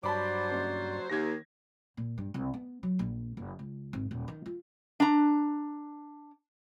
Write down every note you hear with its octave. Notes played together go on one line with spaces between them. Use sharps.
G2 F#3 C5 D5 A5 B5 D6
F#1
D#2 G#6 A#6
A#2
G2
C2
B3
F#3
A#1
F#1
C#2
G#1
D#1
D#3
F4
D4 A#5